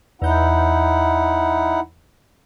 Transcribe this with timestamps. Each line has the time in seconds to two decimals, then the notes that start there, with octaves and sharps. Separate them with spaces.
0.22 E2 D#4 E4 F#5 G6